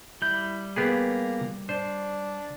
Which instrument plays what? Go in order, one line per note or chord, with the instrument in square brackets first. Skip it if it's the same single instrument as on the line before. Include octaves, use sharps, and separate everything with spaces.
[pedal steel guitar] G3 G6 [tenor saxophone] E4
[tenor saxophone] A#3 [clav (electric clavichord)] B3 G4 G#4
[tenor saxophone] D4 [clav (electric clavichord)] C5